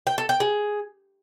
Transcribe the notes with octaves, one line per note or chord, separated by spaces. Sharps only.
G5
A4
G5
G#4